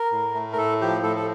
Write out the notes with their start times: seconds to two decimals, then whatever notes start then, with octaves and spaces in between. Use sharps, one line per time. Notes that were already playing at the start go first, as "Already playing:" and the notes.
Already playing: A#4
0.12 A2
0.34 A3
0.52 A#4
0.57 A2 A4
0.81 F3 G4
1.03 A2 A4
1.16 A4